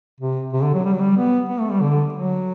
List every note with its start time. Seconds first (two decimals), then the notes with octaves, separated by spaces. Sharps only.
0.20 C3
0.53 C3
0.63 D3
0.74 F#3
0.85 G3
0.93 F#3
1.00 G3
1.17 B3
1.49 B3
1.60 A3
1.71 G3
1.81 D3
2.13 F#3